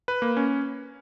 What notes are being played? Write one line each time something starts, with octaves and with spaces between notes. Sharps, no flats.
B4
A#3
C#4